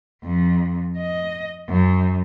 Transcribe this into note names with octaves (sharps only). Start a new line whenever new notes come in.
F2
D#5
F#2